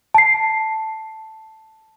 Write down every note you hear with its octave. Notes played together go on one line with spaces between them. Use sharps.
A5 C7